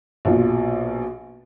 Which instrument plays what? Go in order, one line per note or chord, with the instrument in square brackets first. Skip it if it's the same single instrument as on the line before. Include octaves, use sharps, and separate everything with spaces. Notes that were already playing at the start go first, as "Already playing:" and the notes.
[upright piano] A#1 B2 F4